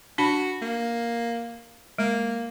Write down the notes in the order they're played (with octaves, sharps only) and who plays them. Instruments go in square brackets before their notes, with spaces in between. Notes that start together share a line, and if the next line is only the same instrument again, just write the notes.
[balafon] D4 A5 B5 [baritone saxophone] F#4
[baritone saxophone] A#3
[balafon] G#3 [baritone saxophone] A#3